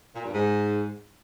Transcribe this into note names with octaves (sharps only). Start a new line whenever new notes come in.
A#2
G2
G#2